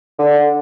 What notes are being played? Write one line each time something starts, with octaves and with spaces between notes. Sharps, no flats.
D3